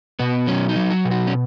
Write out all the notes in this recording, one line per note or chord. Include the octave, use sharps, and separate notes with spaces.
B2 B3
F#3 C#4
D#4
F#3
F#4
B2
F#4
C#4